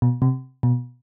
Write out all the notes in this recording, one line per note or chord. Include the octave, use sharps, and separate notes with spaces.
B2
C3
B2